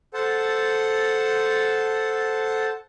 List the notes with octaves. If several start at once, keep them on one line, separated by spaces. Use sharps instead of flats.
A4 C5 F#5 A5